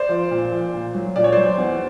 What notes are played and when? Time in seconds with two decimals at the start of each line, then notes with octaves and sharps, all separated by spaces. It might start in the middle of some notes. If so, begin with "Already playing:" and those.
Already playing: C5 D5
0.09 F3
0.31 A#2
0.52 F3
0.74 A#2
0.94 F#3
1.16 A#2 D5
1.24 C#5
1.32 F#3 C5 D5
1.58 E2